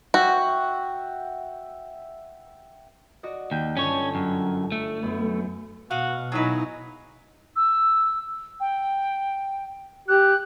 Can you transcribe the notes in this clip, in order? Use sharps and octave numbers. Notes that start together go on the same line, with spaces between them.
F#4 E5 F#5 G5
F#4 D5 D#5
D#2 G5
G1 C#4 C#5 A5
F#2
A3
F#2 B3
B2 F#4 F5 D#6
F#3 D#4 E4 G#4 B4
E6
G5
G4 F#6